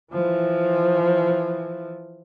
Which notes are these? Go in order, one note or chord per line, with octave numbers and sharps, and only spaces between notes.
E3 F3